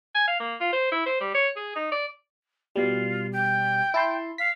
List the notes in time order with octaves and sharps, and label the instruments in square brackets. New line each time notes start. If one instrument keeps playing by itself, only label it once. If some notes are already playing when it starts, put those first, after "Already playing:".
[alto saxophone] G#5
F5
A#3
F4
C5
E4
C5
G3
C#5
G#4
D#4
D5
[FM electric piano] B2 G3 [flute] F4
[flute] G5
[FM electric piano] E4 A5 C6
[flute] F5 [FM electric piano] B6